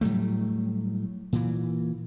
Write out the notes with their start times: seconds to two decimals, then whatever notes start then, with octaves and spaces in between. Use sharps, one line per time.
0.01 A2 F#3 G3 A3
1.33 A#2 E3